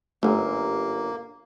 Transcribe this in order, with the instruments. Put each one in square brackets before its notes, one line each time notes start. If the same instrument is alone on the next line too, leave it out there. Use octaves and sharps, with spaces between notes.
[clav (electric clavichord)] G1 F#2 [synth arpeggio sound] A3 [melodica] A#3